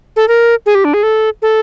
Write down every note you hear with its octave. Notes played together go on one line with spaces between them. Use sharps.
A4
A#4
G#4
G4
D4
G#4
A4
A4